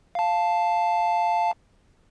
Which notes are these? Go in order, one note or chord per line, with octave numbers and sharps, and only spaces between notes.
F5 A5